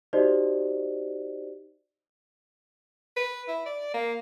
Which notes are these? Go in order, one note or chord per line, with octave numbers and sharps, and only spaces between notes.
D#4 F#4 G4 C5 D5 D#5
B4
E4
D5
A#3